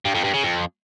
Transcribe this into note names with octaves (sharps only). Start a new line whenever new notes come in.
G2
F2
G2
C#3
F2